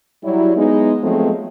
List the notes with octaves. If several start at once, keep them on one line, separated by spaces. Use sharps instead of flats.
F#3 G3 E4
G#3 B3 D#4
F3 F#3 G#3 A3 B3 C4